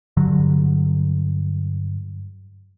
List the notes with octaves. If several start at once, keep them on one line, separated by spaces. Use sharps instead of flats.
G2 D3 F#3